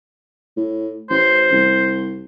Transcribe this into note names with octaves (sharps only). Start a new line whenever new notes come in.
A2
A1 C5
C2